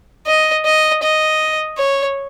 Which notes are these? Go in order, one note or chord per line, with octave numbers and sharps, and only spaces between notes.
D#5
D#5
D#5
C#5